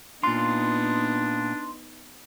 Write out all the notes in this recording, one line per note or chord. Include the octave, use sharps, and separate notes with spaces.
A#2 B3 D4 D#4 F4 C6